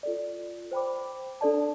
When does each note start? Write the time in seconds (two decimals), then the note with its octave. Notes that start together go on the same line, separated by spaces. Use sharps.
0.03 F4 A4 D5
0.72 C5 G5 B5 D6
1.41 D4 A4 D5 A5